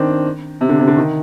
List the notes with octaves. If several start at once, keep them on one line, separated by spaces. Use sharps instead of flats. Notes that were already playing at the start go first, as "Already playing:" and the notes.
Already playing: D#3 C4 D4
C3
D3
C3
D3
D#3